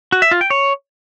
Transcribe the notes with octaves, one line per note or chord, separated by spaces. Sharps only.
F#4
E5
F4
G5
C#5